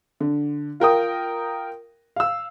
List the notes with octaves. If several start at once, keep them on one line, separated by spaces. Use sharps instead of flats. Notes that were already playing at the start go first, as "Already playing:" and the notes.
D3
F4 A#4 G5 D#6
F5 E6